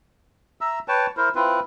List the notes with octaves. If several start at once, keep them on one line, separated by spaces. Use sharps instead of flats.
E5 A#5 E6
B4 C#5 G5 A5
E4 A#4 C5
C4 E4 F4 B4